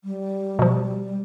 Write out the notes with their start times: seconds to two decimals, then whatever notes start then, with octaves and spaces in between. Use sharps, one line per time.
0.04 G3
0.59 B2 F3